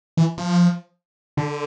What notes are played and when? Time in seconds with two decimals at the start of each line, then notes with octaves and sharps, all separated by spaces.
0.17 E3
0.38 F3
1.37 D3